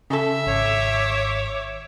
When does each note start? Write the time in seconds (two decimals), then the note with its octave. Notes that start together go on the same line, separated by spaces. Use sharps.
0.10 C#3 A4 E5
0.47 G#1 C#5 D6